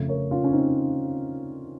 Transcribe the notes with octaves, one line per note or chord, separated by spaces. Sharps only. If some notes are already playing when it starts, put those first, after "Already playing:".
Already playing: F2 C#3 A3
A#4 C#5
C#4 F4
C#4
C4 D#4